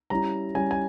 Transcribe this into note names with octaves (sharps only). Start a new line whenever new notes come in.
G3 C#4 E4 A#5
G3 C#4 E4 G#5
G#5